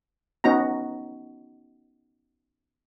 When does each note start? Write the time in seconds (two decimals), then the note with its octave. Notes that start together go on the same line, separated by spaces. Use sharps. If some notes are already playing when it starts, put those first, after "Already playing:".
0.44 B3 C#4 D#4 F#4 A#5